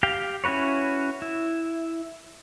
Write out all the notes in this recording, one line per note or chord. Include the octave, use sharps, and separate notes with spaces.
G4 F5 G5
C#4 E4 F#4 B4 C#5
E4